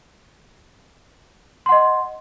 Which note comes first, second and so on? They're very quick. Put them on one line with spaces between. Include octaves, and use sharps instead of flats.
C6 F#5 D#5